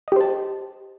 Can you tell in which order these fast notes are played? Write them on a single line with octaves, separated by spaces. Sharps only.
D#5 G4 C5 A5